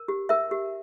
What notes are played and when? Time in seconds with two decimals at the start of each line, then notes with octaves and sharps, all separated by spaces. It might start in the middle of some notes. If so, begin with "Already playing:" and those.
Already playing: A#4
0.08 G4
0.29 A#4 E5
0.51 G4